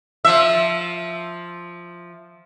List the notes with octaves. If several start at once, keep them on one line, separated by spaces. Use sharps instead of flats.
F3 E5